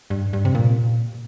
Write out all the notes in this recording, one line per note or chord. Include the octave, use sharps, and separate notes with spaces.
G2
G2
C3
A#2